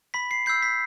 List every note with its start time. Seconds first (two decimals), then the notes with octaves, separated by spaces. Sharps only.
0.14 B5 B6
0.31 C7
0.46 E6 G6 C7
0.62 B6